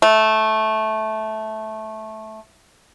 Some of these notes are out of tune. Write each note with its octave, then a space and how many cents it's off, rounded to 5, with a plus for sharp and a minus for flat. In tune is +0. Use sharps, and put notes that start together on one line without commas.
A3 -10